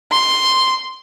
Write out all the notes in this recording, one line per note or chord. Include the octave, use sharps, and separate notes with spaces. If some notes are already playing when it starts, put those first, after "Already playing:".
C6